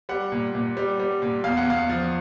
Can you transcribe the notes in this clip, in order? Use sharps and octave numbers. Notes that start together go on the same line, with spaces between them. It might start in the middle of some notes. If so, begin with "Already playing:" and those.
G3 F#5
A#2
A#2
G3
G3
A#2
E2 F5
F#5
E2 F5
F3